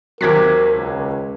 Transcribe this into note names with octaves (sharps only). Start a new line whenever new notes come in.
D#2 C3 F#3 A#4 D6 G#6 B6
C#2